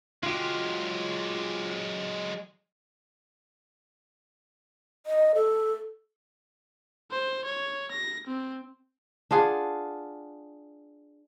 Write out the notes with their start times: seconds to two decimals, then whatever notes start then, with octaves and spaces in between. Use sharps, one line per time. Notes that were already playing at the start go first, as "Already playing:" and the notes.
0.23 F#3 G#3 F4 G4
5.06 D#5
5.35 A4
7.12 C5
7.45 C#5
7.91 A#6
8.27 C4
9.31 D4 F4 G#4 F#5